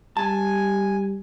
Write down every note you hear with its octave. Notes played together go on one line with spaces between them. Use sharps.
G3 G#5 A5